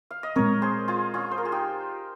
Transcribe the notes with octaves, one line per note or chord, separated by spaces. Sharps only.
F5
D#5
A#2 G#3 C4 A#4 C#5
G#4 C5
F4 G#4
C#4 F4
C5
A#4
G#4
D#4 G4